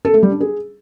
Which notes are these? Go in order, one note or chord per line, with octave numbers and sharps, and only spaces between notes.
A4
A3
G3
D4
G#4